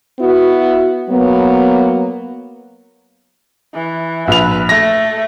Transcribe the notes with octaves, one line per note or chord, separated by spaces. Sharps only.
B3 E4 F#4
F#3 A#3 B3
E3
A#1 B4 F7
A3 A#6